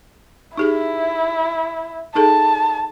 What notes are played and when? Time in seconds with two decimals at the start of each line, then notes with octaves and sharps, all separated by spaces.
0.57 D#4 E4 G4 G#4
2.15 D#4 G#4 A4 A5